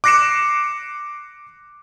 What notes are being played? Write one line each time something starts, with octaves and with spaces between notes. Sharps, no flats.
D6 F#6 A#6 C7 C#7 E7